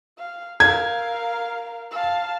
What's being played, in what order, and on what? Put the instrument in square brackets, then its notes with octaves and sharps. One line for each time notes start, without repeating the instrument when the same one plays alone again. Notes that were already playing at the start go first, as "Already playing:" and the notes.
[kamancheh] F5
[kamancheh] A#4 F5 [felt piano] G#6
[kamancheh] F5 A5